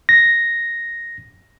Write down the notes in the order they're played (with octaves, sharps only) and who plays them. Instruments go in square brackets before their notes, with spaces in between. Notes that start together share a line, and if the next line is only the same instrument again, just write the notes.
[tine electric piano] A#6